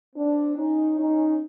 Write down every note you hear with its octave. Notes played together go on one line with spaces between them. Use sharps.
C4 D4
C#4 D#4
C#4 D#4